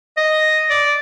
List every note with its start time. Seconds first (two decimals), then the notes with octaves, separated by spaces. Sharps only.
0.17 D#5
0.70 D5